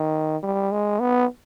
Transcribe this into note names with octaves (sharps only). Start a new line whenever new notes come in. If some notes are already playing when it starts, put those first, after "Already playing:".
Already playing: D#3
G3
G#3
B3